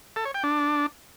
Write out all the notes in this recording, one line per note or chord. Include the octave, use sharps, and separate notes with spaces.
A4
C#5
G5
D4